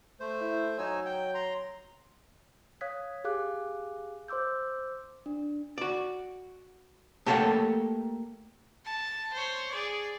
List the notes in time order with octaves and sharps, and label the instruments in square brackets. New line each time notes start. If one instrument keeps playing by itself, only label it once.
[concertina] A3 C5
[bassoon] E4
[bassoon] F#3 [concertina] D#4 G#5 E6
[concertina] G5
A#5 C6
[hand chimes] C#5 F5 D#6 F#6 G#6 B6
G4 G#4 F5 D6 F#6
C5 C6 D6 E6 G6
D4
[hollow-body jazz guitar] F#4 D5
A3 A#3 G4 A4 C#5 F#5
[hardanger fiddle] A5
C5 C#5
G#4 D5